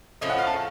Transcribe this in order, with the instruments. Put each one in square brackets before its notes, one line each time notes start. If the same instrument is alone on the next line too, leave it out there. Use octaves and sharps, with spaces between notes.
[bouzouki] A2 F3 A3 C#4 [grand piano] D#5
[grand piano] F#5
F5
A5